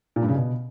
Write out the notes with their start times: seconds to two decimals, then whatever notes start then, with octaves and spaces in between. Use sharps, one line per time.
0.16 A#2
0.22 G2
0.28 C#3
0.35 B2